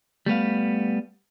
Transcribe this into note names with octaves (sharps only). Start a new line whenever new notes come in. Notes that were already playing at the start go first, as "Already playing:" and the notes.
G3 A3 B3 F5